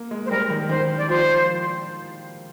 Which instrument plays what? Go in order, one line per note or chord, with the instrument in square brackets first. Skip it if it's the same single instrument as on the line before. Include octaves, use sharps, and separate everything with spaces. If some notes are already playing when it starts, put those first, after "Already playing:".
Already playing: [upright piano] A#3
G#3
[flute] C5
[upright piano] G3 [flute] A#4
[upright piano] D#3
[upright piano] D#3 [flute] C5
[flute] D5
[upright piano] F3 [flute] C5